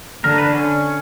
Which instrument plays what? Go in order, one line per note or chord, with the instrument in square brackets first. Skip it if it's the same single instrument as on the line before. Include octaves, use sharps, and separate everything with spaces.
[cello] D3 [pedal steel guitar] A#4
[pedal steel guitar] B4
C#4